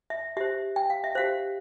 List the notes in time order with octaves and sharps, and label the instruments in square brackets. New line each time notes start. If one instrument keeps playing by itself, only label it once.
[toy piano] E5
G4 C5 E5
G5
F5
E5
G4 C5 F5